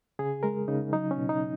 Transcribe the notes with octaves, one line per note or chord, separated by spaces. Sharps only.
C#3 G#4
G#3 A#4
C#3 D#4
F#3 D#4
C#4
B2
D#4